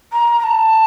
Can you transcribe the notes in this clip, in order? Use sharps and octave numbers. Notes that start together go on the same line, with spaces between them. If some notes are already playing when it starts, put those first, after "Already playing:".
A#5
A#5
A5